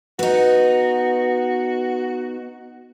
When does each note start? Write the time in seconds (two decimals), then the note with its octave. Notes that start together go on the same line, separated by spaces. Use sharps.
0.19 B3 D#4 F#4